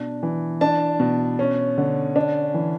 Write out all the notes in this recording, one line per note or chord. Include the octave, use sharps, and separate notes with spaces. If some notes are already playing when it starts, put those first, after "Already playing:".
Already playing: B2 D4
E3
D4 A5
B2
C#4
D3
D4
E3